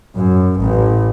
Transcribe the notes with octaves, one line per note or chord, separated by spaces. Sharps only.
F#2
A1